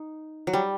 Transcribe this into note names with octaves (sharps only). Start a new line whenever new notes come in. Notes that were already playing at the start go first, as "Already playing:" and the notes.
Already playing: D#4
F#3
G3